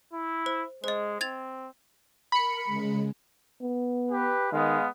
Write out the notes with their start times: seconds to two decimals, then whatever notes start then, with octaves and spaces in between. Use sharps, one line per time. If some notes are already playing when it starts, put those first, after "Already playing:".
0.13 E4
0.46 C5
0.84 G#3 C5 D#5
1.21 C4 G#6 A6 F7
2.32 A#4 B5 C#7
2.65 C#3 G#3
3.61 B3
4.11 G4 B4
4.52 D#3 G#3 B3 F5